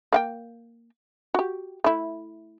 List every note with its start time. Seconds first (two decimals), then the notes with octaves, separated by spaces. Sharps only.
0.13 A#3 F#5 G5
1.34 F#4 G4
1.84 A3 E4